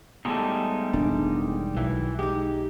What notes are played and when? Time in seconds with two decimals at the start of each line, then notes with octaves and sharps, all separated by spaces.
0.25 E2 A2 G3 G#3 D#4 A4
0.93 E1 D#3 D4
1.77 B1 E3 F#3
2.19 G#3 D#4 G4